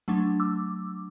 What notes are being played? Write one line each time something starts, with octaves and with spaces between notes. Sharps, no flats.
F#3 A3 D4
D6 E6